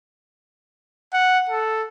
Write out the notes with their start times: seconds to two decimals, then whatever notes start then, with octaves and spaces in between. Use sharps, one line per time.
1.13 F#5
1.49 A4